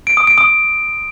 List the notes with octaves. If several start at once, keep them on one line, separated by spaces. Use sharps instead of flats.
D7
D#6
D7
D#6